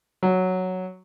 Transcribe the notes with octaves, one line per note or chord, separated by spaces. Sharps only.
F#3